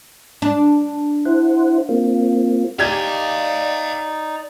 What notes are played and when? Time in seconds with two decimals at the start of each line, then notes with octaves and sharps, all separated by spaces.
0.42 D4
1.26 E4 C5 F#5
1.89 A#3 C4 F4
2.79 D#4 G4 D5 D#5 F5 G#6